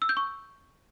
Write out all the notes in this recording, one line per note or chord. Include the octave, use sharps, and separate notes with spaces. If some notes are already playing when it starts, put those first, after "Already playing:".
E6
G6
C#6